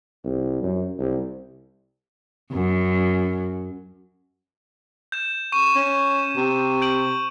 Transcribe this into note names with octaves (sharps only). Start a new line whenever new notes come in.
C2
F#2
C2
F#2
G6 E7
C#6 D#7 E7
C#4
C3
G6 D7 F#7